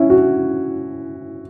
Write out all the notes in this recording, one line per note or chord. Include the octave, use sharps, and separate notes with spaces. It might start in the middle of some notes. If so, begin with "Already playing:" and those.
Already playing: C#4 E4
F#4